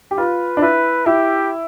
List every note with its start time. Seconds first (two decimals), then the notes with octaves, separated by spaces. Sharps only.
0.11 G4
0.18 F4 B4
0.57 D4
0.62 E4 B4
1.06 E4 G4